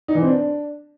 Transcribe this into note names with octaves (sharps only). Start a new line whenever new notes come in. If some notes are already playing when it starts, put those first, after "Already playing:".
D#4
E3
C4
D4